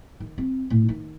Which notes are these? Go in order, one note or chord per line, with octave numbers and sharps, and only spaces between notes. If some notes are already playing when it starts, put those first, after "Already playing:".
D#3
C4
A2
D#3